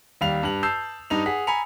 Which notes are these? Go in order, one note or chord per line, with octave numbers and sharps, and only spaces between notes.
D#2 G3 F5 F7
G2 F#7
A5 E6 G6 C7 E7
G2 D#4 F7
G#4 F#5 B6
G#5 A#5 B5 C#7 F7